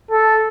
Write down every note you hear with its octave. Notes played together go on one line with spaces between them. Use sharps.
A4